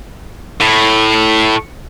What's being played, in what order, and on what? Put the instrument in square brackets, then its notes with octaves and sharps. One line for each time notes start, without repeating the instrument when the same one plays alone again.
[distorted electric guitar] A2